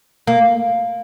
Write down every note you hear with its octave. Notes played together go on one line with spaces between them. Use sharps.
A#3